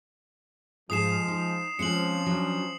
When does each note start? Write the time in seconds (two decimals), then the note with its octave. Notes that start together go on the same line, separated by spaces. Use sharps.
0.90 G#2 F3 G#3 G#4 D#6 C7 E7
1.28 D#4
1.79 F3 G#3 C4 C#4 C5 C#7 F#7
2.26 F#3 D4